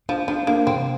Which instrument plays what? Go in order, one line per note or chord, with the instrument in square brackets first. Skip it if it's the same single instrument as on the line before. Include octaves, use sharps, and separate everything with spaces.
[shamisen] F3 [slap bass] D4
[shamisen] F3 [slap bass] D4
[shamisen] A#3 [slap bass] D4
[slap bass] C3 [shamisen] C4